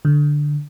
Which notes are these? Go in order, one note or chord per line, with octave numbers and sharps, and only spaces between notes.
D3